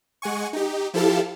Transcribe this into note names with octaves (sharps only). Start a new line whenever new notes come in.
G#3 F#5 G#5 C#6
D#4 G4
F3 E4 G4 A4 F5 A5